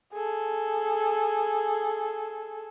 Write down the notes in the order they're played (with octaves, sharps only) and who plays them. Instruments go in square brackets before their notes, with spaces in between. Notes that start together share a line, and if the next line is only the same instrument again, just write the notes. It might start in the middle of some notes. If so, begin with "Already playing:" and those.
[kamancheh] G#4 A4